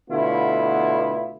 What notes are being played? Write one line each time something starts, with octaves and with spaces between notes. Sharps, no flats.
B2 D3 A3 B3 E4 F4